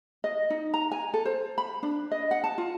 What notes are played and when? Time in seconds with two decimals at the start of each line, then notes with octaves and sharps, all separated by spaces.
0.24 D#5
0.50 D#4
0.74 A#5
0.91 G#5
1.14 A4
1.25 C5
1.58 B5
1.83 D4
2.11 D#5
2.31 F#5
2.44 A5
2.58 F4